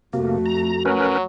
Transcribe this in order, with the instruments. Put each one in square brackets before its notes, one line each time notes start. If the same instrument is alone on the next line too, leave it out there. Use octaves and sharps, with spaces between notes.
[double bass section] F2 A3 [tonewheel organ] C3 A#3 [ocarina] F#4
[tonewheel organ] A#5
[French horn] F#3 [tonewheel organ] C#4 A#4 B4